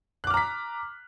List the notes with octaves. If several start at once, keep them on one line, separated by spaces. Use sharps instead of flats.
A#5 D6 F6 F#6 B6